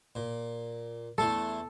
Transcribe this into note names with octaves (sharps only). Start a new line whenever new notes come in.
A#2
E2 A3 A4 C6